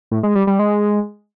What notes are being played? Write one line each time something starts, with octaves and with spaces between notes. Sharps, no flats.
A2
G#3
G3
G3
G#3